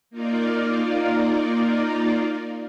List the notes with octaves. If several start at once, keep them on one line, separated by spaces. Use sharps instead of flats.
A#3 D#4 F4 A#4 D5